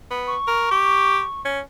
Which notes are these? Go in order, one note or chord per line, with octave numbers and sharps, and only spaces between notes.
B3
C#6
A#4
G4
C#4